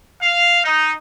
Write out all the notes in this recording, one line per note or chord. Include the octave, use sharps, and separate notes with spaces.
F5
D#4